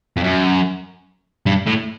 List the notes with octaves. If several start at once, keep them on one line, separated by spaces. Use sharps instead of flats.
F2
F#2
G2
A2